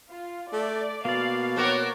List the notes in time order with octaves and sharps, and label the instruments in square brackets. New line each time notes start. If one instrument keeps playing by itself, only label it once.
[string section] F4
[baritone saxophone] A3 [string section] D5
[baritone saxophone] B2 [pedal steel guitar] A#3 D5 [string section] F5
[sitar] C4 F#4 A#4 [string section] C#5 D6